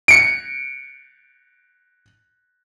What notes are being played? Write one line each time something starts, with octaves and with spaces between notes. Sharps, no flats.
C#7 D7